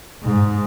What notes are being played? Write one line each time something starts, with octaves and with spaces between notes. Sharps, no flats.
G#2